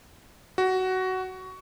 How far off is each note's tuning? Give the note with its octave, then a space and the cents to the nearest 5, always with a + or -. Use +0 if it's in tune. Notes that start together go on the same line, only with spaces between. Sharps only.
F#4 +15